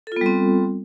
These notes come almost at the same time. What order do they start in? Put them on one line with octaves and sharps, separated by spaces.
A4 F4 B3 G3 C4